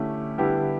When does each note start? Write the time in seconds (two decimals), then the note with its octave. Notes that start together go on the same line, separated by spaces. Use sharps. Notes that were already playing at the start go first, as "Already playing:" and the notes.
Already playing: D3 A3 C#4 E4 G4
0.38 D3 G3 B3 E4 G4